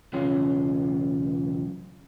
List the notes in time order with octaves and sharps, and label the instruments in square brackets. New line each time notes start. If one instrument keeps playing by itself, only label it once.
[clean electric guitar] B1 E2 C#3 C#4 F4 C6